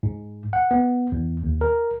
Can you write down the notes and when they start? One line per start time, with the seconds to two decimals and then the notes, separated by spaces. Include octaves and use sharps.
0.03 G#2
0.53 F#5
0.71 B3
1.12 E2
1.44 D#2
1.61 A#4